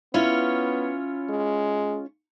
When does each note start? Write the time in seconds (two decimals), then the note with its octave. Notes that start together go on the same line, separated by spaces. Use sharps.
0.14 B3 C#4 E4 F4 C#5
1.30 G#3